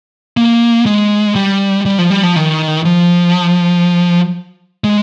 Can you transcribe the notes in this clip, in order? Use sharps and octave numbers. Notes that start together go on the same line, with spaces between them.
A#3
G#3
G3
G3
F3
G3
F3
D#3
F3
G#3